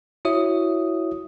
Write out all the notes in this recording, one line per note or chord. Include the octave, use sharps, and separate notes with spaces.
E4 F#4 C#5 E5 D#6